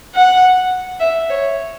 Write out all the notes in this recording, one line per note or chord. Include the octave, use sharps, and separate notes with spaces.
F#5
E5
C#5